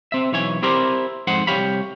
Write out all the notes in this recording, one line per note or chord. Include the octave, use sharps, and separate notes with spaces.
C4 E5
B1 E3 C#5 G#5
C4 E4 G4 A#4 C5 D5
F2 G#2 C5 F#5
C2 G4 C#5 F5 B5